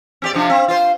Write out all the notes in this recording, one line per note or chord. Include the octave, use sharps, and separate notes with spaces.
C4 G4 D5
C3 F3 D4
C4
F4 C5